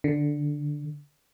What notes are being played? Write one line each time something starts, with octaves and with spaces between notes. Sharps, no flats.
D3